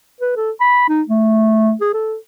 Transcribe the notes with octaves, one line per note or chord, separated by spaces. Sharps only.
B4
A4
B5
D#4
A3
G#4
A4